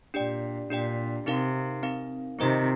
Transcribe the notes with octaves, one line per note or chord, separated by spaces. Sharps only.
A#2 D4 G4 D5 G5
A#2 D4 G4 D5 G5
C3 C4 D#4 A#4 F5
C4 D#4 A#4 F5
C3 D#3 C4 F4 C5 D#5